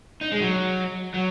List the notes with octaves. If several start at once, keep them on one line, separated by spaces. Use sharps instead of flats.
D#4
G#3
F#3
F#3